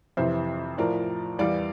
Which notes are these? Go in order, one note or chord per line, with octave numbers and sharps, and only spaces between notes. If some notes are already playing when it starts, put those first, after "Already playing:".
F2 C3 E3 C5 E5
A2 F3 A#4 D5
E2 E3 G3 D5 F5